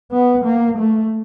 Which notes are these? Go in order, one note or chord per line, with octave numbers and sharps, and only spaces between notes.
B3
A#3
A3